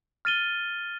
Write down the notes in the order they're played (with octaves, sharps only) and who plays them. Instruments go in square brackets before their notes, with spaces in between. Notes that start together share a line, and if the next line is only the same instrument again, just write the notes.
[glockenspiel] F6 A6 D#7 G7